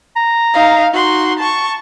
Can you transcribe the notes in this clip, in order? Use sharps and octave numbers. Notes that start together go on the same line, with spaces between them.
A#5
D#4 F5
D#4 F#4 C6
A5 C#6